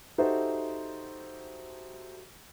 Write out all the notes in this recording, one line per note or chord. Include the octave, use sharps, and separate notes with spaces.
D#4 F#4 G4 A4 C5 E5